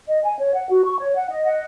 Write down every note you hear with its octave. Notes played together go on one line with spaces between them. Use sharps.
D#5
G#5
C#5
F#5
F#4
C#6
C#5
F#5
D#5
F#5